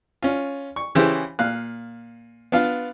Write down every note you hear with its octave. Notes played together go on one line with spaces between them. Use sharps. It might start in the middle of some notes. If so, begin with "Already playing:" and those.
C#4 F4
C#6
C#3 E3 C#4 E4 G4 C5
A#2 F5 F#6
B3 D4 F4 F5